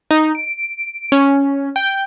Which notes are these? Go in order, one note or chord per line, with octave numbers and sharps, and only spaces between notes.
D#4
D7
C#4
G5